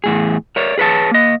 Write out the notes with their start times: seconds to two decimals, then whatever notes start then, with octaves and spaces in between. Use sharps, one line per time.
0.04 E2 A2 G#4
0.56 A#4 C#5 D5
0.78 G#4 B4 C#5 A5
1.11 A#3 D#5